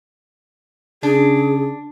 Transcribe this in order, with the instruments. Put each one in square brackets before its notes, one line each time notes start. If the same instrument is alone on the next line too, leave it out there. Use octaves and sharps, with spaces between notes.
[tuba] C#3 [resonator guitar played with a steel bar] D4 [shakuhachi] G#4